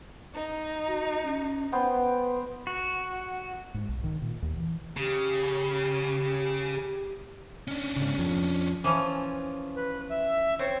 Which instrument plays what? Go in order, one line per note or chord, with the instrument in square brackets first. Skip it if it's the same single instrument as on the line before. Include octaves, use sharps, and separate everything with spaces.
[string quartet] D#4
[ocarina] F#4
C#4
[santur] B3 C5 G5 [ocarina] B4
[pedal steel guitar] F#4
[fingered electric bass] G#2
B1
D#3
A#2
D#2
E3
[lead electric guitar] C#3 [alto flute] G4
[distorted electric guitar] C#4 D4
[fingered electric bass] G#2 C#3
F2 F3
[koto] E3 F3 C#4
[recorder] B4
E5
[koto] C4 [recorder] C#5